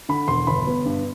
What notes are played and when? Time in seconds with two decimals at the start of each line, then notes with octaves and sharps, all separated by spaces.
0.09 D3 B5
0.28 E1 C6
0.47 G1 B5
0.67 B3
0.85 G2